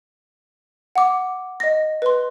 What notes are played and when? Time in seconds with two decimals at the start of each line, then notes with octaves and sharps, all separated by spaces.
0.95 F#5 D6
1.60 D#5 A#6
2.02 B4 C6